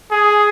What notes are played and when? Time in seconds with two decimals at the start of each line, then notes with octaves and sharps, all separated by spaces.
0.11 G#4